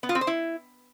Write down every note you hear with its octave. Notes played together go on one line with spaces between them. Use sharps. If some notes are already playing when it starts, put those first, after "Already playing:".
B3
F4
C4
C5
E4